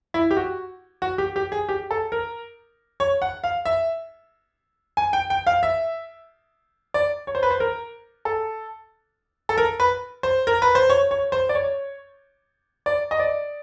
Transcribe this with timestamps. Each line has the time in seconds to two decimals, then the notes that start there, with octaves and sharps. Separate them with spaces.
0.14 E4
0.31 G4
0.37 F#4
1.02 F#4
1.18 G4
1.36 G4
1.52 G#4
1.69 G4
1.91 A4
2.12 A#4
3.00 C#5
3.22 F#5
3.44 F5
3.65 E5
4.97 G#5
5.13 G5
5.30 G5
5.47 F5
5.63 E5
6.94 D5
7.27 C#5
7.35 C5
7.43 B4
7.51 C5
7.60 A#4
8.25 A4
9.49 A4
9.58 A#4
9.80 B4
10.23 C5
10.47 A#4
10.62 B4
10.75 C5
10.90 C#5
11.11 C#5
11.32 C5
11.49 D5
11.55 C#5
12.86 D5
13.11 D#5
13.20 D5